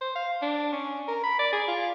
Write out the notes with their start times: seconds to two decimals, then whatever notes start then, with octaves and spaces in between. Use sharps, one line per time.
0.01 C5
0.16 F5
0.42 D4
0.73 C#4
1.08 A#4
1.24 B5
1.39 D5
1.53 G#4
1.68 F4